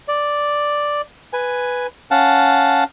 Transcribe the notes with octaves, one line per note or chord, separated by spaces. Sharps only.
D5
B4 G#5
C#4 F5 F#5 A5